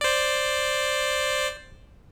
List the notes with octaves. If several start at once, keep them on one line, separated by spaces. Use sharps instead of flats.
C5 D5